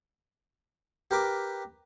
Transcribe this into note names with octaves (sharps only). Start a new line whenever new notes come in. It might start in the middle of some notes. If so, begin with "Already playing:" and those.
G4 A#4 B4 D6